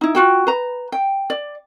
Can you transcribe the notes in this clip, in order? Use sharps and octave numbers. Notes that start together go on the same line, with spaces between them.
D#4 E4
F4 F#4 G5
B4 A#5
G5
D5